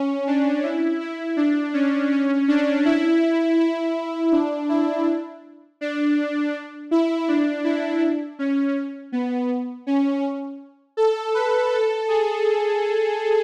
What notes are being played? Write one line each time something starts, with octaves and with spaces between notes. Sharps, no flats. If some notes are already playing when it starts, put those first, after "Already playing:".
Already playing: C#4
D4
E4
E4
D4
C#4
C#4
D4
E4
E4
D4
E4
D4
E4
D4
E4
C#4
B3
C#4
A4
B4
A4
G#4